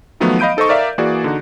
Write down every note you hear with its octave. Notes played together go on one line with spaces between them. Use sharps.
D#3 F3 F#3 A3 B3
D#5 F5 B5 G6 D7 D#7
D#4 A4 C5 D#5 C#6
A#4 D5 E5 F5
E3 A#3 F#4 G#4 D5
D3 D#4 F#4